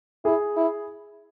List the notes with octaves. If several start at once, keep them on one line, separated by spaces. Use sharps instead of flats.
E4 G#4
E4